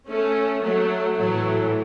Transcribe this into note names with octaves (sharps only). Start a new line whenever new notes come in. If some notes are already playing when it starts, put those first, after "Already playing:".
A3 C#4
F#3 A3
A2 E3 F#3 A3